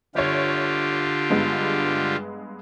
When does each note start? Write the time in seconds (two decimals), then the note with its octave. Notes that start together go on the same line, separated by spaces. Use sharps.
0.15 G1 D3 F4 G4 C#5
1.30 G2 G#3 B3